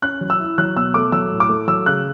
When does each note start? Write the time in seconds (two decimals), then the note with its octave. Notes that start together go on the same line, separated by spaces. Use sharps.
0.02 C#4 F#6
0.21 F#3
0.30 E6
0.40 E4
0.58 F#3 F#6
0.76 B2 E6
0.94 A3 D6
1.12 F#3 E6
1.31 A2
1.40 D6
1.49 A3
1.68 F#3 E6
1.86 C#3 F#6